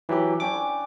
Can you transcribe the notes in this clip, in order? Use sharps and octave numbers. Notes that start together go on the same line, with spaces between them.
E3 F#3 E4 G4 B4
C#4 D4 G5 D6
B4